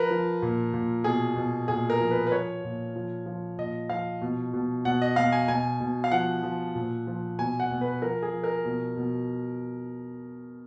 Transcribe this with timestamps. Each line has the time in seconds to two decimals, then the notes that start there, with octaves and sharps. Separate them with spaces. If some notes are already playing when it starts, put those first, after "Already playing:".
Already playing: F3 A#4 B4
0.11 F3
0.42 A#2
0.74 A#2
1.04 B2 G#4
1.36 B2
1.68 A#2 G#4
1.90 A#4
2.01 F3
2.11 B4
2.27 B4
2.32 F3 C#5
2.64 A#2
2.96 F3
3.26 F3
3.58 A#2 D#5
3.89 F3 F5
4.21 B2
4.53 B2
4.85 B2 F#5
5.02 D#5
5.16 B2 F5
5.32 G#5
5.48 B2 G#5
5.80 B2
6.04 F5
6.12 F3 F#5
6.43 F3
6.75 A#2
7.07 F3
7.39 B2 G#5
7.60 F#5
7.71 B2
7.81 B4
8.02 F3 A#4
8.22 G#4
8.33 F3
8.44 A#4
8.65 B2
8.96 B2